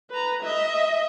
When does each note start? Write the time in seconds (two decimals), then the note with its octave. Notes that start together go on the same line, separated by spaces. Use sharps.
0.10 B4 A#5
0.43 D#5 E5